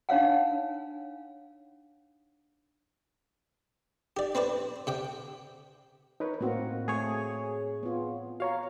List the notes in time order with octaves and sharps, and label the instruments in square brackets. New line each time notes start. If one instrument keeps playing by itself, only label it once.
[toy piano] D4 D#4 C#5 F5 F#5
[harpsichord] G4 D5
C4 B4 C5 D5
C3 G5 D6
[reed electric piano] D#4 A#4 B4 [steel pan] C#5
[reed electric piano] A2 C4 [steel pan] A#3 F#4
[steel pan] A3 [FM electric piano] G#4 C#5
[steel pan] B3 F4
[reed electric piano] F#4 C#5 A#5 [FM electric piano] F5